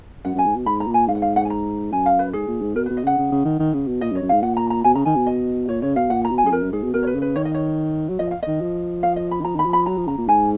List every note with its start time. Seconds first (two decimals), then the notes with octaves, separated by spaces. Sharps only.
0.25 F#2 F#5
0.35 F#2 G#5
0.46 G#2
0.56 B2
0.66 G#2 B5
0.80 A#5
0.87 A#2
0.94 G#5
1.09 G#2 F5
1.15 F#5
1.22 F5
1.36 F#5
1.45 G#5
1.50 A#5
1.92 F#2 G#5
2.06 F5
2.19 B4
2.33 G#2 G#4
2.48 A#2
2.61 G#2
2.76 B2 A#4
2.86 B2 B4
2.97 D#5
3.04 C#3 F#5
3.18 C#3
3.32 C#3
3.45 D#3
3.59 D#3
3.74 C#3
3.87 B2
4.01 A#2 D#5
4.11 F#2
4.15 C#5
4.22 F#2
4.29 G#2 F5
4.43 A#2 F#5
4.57 A#5
4.70 A#5
4.84 B2 G#5
4.95 C#3 A#5
5.05 D#3 G#5
5.16 B2
5.27 D#5
5.68 A#2 C#5
5.82 C#3 C#5
5.96 B2 F5
6.10 A#2 F#5
6.25 A#5
6.31 B2
6.38 G#5
6.44 F#2 G#4
6.52 F2 A#4
6.63 F#2
6.72 G#2 G#4
6.83 B2
6.94 B2 A#4
7.03 C#5
7.07 B4
7.14 C#3
7.22 B4
7.36 D#3 C#5
7.45 D#5
7.55 C#5
8.09 F#3
8.19 F3 D#5
8.31 F5
8.43 D#3 D#5
8.61 F3
9.03 F5
9.16 D#5
9.31 B5
9.41 D#3
9.45 F3 A#5
9.56 D#3 B5
9.66 F3
9.73 B5
9.86 F#3 A#5
9.97 F3
10.08 C#3 A#5
10.18 A#2
10.28 G#2 G#5